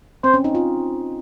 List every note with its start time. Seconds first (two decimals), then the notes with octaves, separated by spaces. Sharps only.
0.23 C4 C5
0.34 C#4
0.44 D#4
0.55 F4